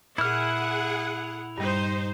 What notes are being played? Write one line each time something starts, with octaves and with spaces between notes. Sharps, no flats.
A#2 E4 G#4 F#5 F6
G2 G3 D#4 C5